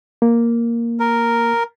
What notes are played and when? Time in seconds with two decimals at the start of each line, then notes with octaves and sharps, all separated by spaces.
0.22 A#3
1.00 A#4